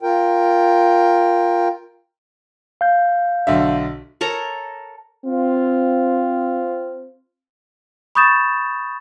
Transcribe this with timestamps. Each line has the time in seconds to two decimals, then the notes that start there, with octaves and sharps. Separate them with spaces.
0.02 F4 A#4 G5
2.81 F5 G6
3.47 B1 D3 E5
4.21 A4 A#4 C#5 A#5
5.25 C4 F4
8.15 B5 C#6 D#6 G6 A6 E7